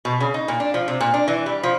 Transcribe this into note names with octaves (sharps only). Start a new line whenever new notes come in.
B2
C#3
D#4
A#2
D4
F3
C3
A#2
D4
E3
G3
F3